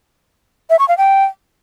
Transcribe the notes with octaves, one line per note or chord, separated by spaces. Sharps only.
E5
C#6
F5
G5